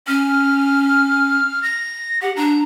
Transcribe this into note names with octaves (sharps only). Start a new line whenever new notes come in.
C#4 F6
A#6
G4 F#5
D4 A#5